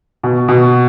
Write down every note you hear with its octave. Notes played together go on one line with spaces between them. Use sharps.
B2
B2